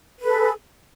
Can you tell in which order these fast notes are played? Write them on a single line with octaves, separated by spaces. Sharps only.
B4 A4 G#4